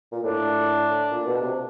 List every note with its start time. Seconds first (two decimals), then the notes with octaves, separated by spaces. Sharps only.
0.12 A#2
0.23 A2 D4
1.11 A#2
1.26 B2
1.41 C3